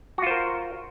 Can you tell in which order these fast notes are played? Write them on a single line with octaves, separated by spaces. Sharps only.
F#4 F4 C5 A#4